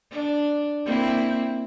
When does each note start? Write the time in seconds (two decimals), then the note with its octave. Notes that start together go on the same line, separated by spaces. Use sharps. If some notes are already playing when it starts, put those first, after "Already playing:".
0.11 D4
0.85 A#3 C4 E4